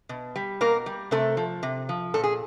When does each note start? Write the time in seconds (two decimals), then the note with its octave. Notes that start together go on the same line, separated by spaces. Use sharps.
0.09 B2
0.36 G3
0.61 B2 A#3 A#4
0.86 G3
1.11 C3 A3 A4
1.37 F3
1.63 C3
1.89 F3
2.14 A#2 A4
2.23 G#4